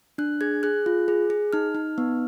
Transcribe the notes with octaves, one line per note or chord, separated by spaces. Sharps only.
D4 F#6
G#4 G#6
G#4 F#6
F4
G#4
G#4
D#4 F6
D#4
B3